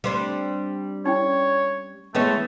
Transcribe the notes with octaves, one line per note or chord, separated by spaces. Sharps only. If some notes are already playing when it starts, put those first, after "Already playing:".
G3 C4 D4
C#4 E4 C#5 G5
E3 G#3 A3 B3 C#4